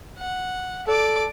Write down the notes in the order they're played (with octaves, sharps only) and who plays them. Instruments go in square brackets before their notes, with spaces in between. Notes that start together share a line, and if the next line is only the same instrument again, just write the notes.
[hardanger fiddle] F#5
[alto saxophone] A4 [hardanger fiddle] D5 D6